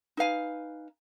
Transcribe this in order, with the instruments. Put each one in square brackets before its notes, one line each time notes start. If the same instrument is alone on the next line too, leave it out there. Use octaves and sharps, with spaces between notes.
[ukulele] D#4 B4 F5 G#5